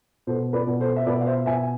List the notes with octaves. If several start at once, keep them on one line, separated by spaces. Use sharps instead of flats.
B2 A4 C5
B4 D5
B2
A4 C5
E5
B2 B4 D5
F5
C5 E5
B2 E5 G#5
G#5